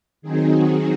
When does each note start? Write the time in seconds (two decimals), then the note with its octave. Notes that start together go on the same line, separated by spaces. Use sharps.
0.22 D#3 F#3 C4 D#4 G#4
0.52 F#4